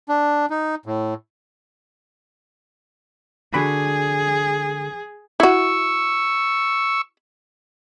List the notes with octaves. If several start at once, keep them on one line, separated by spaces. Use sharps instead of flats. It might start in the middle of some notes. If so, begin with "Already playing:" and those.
D4
D#4
A2
D3 F#4 G#4 B5
E4 F#4 C#6 E6